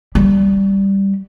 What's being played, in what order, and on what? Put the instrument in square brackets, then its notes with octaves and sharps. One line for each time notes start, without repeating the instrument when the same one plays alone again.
[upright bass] G3